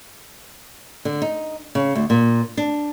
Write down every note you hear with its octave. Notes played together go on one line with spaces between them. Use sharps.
D3
D#4
C#3
D2
A#2
D4